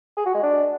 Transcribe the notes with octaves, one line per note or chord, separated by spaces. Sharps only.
G#4
F#4
G#3
D4